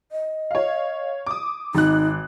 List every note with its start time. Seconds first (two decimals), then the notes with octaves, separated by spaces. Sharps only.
0.12 D#5
0.51 C#5 F5
1.26 D6 D#6
1.75 G#1 D#4 F#6